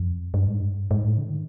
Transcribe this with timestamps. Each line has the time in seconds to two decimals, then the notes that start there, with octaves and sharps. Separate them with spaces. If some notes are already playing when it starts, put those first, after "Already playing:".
Already playing: F2
0.34 G2
0.47 G#2
0.60 G2
0.91 G#2
1.05 A2
1.18 D3
1.27 D#3